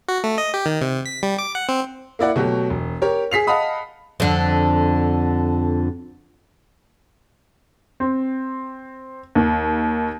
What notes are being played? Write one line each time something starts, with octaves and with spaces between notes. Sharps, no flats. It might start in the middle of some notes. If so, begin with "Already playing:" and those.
F#4
A3
D#5
G4
D#3
C3
B6
G3
D6
F#5
C4
A#3 E4 D5 F#5
B2 F#3 A3 G4
E1
G4 A#4 C#5
G#4 B6 C7 F7
D#5 F5 F#5 A5 B5 D#6
F2 D3
C4
D#2